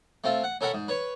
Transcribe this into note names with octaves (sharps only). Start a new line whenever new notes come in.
A3 C4 F4
F#5
C#4 A4 A#4 E5 F#5 B5
G#2
B4 C#5